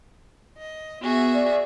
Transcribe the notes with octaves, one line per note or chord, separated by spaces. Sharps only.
D#5
B3 F#4 G#4 E5
D5